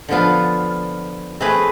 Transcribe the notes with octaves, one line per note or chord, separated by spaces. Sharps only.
D3 F3 B3 F4
A3 C4 G#4 B4